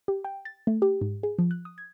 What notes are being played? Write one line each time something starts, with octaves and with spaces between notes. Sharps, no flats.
G4
G5
A6
A3
G4
G#2
G#4
F3
F#6
D#6
G#6